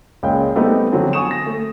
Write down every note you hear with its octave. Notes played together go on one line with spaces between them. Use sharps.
C#2 A#2 G#3 C#5 G5
G3 A3 B3 C4 D#4
D3 F3 F#3 C4
G#5 C#6 D#6 E7
A#6
A3